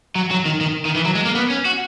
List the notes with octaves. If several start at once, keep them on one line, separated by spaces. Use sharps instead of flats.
F#3
F#3
D#3
D#3
D#3
E3
F#3
G#3
A#3
B3
C#4
F#4